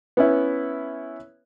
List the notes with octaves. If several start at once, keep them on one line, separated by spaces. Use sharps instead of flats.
B3 C#4 E4